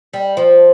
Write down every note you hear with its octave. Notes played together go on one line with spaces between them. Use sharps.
G3
F3